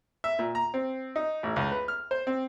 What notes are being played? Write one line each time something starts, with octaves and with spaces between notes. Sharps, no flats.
E5
A#2
A#5
C4
D#4
A1
C#2
B4
F6
C5
C4